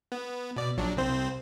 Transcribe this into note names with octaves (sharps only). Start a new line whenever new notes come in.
B3
B2 D5
A#1 F#3 D4
C2 C4 C5